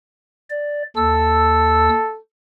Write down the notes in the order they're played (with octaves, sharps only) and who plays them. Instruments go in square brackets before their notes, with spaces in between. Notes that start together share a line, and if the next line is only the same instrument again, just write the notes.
[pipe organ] D5
[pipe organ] D#2 E6 [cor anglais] A4